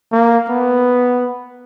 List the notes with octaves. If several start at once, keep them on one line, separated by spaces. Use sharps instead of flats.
A#3
B3